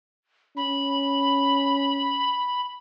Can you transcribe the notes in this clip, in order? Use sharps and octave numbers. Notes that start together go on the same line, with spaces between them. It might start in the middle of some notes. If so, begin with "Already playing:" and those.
C#4 B5